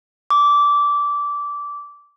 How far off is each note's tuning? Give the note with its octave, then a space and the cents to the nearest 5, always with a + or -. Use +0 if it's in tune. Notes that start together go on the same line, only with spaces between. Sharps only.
D6 -15